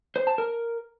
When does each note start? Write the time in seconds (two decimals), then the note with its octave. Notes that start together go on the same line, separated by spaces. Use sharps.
0.16 C5
0.27 A5
0.38 A#4